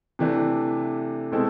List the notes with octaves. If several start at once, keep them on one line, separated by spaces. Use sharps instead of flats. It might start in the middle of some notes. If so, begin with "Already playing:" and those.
C3 E3 A3 D4
B2 G#3 C4 E4 A4